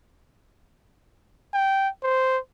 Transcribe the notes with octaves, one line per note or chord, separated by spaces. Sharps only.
G5
C5